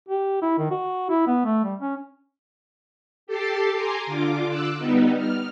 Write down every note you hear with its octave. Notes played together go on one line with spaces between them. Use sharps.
G4
E4
D#3
F#4
E4
B3
A3
G3
C#4
G4 A4 D6 A6 C7
G#5 A#5 C6 D6
D3 F4 D6
D6 E6 F#6
G3 B3 D#4
F6